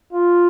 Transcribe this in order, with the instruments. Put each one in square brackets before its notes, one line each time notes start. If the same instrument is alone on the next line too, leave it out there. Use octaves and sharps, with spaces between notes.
[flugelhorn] F4